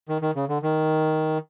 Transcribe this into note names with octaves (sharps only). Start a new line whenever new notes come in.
D#3
D#3
C#3
D3
D#3